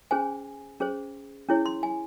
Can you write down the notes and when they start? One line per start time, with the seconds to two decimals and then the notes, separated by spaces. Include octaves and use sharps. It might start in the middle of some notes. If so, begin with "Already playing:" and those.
0.11 C#4 G#4 C5 G#5
0.80 C#4 G#4 C5
1.48 C#4 E4 G#4 C#5
1.66 C6
1.83 G#5